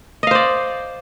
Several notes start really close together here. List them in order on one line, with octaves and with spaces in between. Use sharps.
D#5 F5 C5 D5